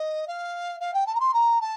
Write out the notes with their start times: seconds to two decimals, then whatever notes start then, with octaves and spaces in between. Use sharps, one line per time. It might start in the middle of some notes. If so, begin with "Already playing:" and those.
Already playing: D#5
0.27 F5
0.80 F5
0.94 G5
1.06 A5
1.15 A#5
1.20 C6
1.33 A#5
1.61 A5